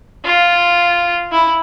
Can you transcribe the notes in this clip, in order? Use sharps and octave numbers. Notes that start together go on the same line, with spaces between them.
F4
E4